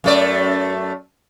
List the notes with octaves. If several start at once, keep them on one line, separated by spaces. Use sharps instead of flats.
F#2 A3 D5